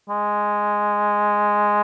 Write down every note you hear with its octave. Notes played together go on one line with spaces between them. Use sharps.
G#3